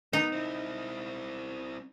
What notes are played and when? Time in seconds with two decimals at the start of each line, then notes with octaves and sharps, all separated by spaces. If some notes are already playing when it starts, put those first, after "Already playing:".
0.13 B3 D#4
0.32 C4 E4